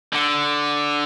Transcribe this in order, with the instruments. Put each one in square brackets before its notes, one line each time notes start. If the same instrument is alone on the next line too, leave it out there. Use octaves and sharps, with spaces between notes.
[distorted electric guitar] D3